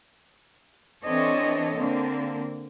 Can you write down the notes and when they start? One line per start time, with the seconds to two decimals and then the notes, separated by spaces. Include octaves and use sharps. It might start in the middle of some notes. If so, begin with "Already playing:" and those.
1.03 E3 C4 D4 A4 C#5 D#5
1.74 D3 A#3 C4